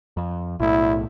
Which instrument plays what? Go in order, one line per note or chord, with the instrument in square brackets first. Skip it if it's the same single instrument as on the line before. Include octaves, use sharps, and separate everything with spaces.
[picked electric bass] F2
[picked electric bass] B1 A2 [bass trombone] E4